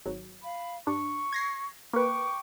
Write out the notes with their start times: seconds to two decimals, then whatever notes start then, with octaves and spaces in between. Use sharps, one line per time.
0.06 G#1 F#3
0.41 F5 B5
0.87 G2 D4 C#6
1.33 G#6 A#6 C7
1.93 A#3 B4 G5 C#6 D6